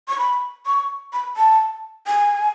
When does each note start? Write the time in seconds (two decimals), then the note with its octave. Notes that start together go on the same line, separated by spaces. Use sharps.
0.08 C#6
0.18 B5
0.66 C#6
1.13 B5
1.37 A5
2.07 G#5